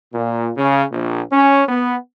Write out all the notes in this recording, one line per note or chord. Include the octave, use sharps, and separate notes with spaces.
A#2
C#3
A#1
C#4
B3